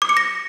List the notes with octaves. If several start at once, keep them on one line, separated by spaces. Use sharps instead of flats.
D6
C#7
A#6